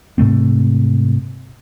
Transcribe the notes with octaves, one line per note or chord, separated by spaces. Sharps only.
G#2 C3 A3 C4